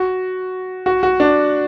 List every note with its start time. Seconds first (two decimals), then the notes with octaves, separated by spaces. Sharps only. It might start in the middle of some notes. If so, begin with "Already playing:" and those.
Already playing: F#4
0.86 F#4
1.03 F#4
1.20 D4